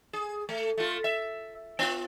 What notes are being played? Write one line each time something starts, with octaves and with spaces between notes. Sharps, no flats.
G#4
A3
A3 F4
E5
B3 F4